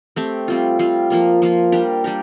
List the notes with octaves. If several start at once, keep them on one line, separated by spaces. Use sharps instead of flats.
A3 C4 G4
G3 C4 F4
G3 C4 F4
F3 A#3 F4
F3 A#3 F4
G3 D4 G4 A#4
G3 D4 G4 A#4